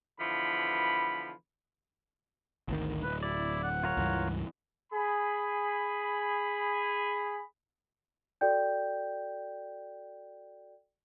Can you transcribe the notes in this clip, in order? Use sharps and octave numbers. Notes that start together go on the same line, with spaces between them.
B2 D3 E3 F3 B5
G#1 D2 D#3
D1 B4
E4 D5
F#5
F4 A#4 C#5
C#2 G2 E3
G#4 B5
F#4 A4 D5 G5 G6